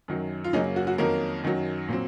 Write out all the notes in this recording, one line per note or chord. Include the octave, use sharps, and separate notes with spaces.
F#2 D#3 F#3
F4
F#2 C#3 F#3 A#3 C#4 D#4
F#4
F#4
F2 D#3 F#3 A#3 C#4 A#4
F#2 D#3 F#3
A#2 F#3 C4